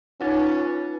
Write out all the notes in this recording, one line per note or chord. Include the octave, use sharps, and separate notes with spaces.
C#4 D#4 F4 B4 F#5 A6